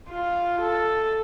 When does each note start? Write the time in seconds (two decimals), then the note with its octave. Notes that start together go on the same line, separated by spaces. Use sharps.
0.11 F4
0.61 A4